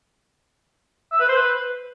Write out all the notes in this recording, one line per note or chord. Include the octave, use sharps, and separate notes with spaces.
E5
B4
C5
B4